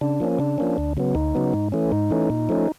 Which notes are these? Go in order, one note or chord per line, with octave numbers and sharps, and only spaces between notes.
C#3 D4
F3 A#3 C#4
C#3 D4
F3 A#3 C#4
D2
C#3 F#3 B3
D2 D#4
C#3 F#3 B3
G#2
E3 A3 C#4
G#2 D#4
E3 A3 C#4
A#2
F3 A3 C#4